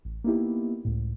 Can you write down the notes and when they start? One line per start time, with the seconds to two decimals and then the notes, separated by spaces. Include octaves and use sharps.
0.05 A1
0.24 A#3 B3 D#4 E4 G4
0.85 C#2 A2